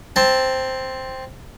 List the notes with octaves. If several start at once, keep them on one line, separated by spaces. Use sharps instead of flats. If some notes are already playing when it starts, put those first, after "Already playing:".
C4 A5